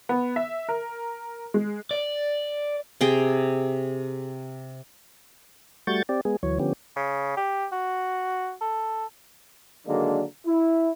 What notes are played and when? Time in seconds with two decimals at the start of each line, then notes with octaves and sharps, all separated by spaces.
0.09 B3
0.36 E5
0.69 A#4
1.54 G#3
1.91 D5
3.01 C3 G#4 G5
5.87 G3 A3 F#4 C#6 G6 A6
6.09 C4 G4 D5
6.25 G#3 B3 G#4
6.43 D2 E3 F#3 C#5
6.59 D3 F3 B3 C#4 G4
6.96 C#3
7.37 G4
7.72 F#4
8.61 A4
9.87 D3 D#3 F#3 G#3 A#3 D4
10.47 E4